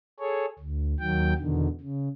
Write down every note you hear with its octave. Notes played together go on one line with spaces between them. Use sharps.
G#4 A4 C#5
D2
D#2 D#3 F#3 G5
E2 B2 D3 D#3
C#3